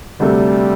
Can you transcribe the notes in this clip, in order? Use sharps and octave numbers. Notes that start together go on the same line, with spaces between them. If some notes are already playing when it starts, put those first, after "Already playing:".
D2 C3 G3 A3